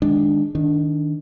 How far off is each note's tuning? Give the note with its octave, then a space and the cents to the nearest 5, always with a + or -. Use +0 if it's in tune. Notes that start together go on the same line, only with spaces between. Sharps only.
D#3 +0 G#3 -5 D4 +0
D#3 +0 D4 -10